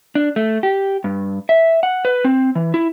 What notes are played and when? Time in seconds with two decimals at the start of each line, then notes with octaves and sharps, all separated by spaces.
0.15 D4
0.36 A3
0.63 G4
1.04 G2
1.49 E5
1.83 F#5
2.05 B4
2.25 C4
2.55 E3
2.74 E4